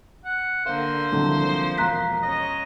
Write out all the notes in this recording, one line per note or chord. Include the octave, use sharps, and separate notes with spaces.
F#5
D3 A#3 C5 F5
C2 D3 F3 F#3 A#3
E1 F5 A#5 C6 F#6 B6
C#4 D#5